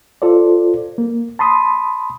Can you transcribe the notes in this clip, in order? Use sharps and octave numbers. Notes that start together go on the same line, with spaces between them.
F4 A4 C5 D5
A#3
A5 B5 C6 D#6